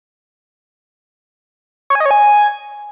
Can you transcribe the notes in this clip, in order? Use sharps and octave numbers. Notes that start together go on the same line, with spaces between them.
C#5
G#5
D#5
C#5
G#5